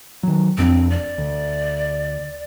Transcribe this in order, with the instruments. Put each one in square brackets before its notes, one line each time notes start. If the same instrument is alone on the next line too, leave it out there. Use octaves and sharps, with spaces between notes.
[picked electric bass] D#3 F#3
[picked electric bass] F1 F2 D4 [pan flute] C4
[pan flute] D5
[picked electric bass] D2